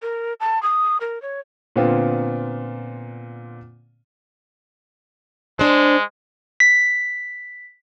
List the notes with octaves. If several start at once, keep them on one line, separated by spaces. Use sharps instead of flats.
A#4
A5
D#6
A#4
C#5
A#2 D3 B3 C4 F4
G#3 D4 C5
B6